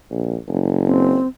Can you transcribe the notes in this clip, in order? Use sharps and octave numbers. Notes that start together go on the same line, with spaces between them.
A#1
F#1
C4